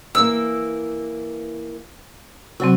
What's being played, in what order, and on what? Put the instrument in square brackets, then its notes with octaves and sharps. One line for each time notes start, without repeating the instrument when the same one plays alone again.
[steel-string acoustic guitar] E3 A#3 [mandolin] E6
[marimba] C3 F#3 C4 [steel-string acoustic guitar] F#4